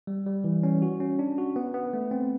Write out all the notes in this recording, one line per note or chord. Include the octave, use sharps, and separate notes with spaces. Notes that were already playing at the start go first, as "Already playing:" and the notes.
G3
G3
E3
C#4
F#4
C#4
D4
F#4
B3
B3
A3
C4